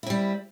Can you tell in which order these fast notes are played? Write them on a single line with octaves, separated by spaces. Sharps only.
E4 C4 G3